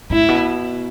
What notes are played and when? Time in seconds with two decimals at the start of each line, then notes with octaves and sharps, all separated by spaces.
0.10 A2 E4
0.29 B2